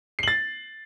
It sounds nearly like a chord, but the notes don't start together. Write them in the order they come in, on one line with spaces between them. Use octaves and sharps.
C7 F#7 A6